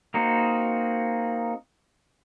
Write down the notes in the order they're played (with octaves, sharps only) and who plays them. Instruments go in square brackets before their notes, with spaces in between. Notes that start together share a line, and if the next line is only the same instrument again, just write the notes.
[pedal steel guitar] A#3 C4 D#4 F#4